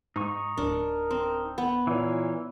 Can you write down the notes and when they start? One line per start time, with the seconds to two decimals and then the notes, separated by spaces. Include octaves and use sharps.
0.16 G#2 D#4 C#6
0.58 D1 D4 A#4
1.11 C4
1.58 B3
1.87 A#2 E3 C#5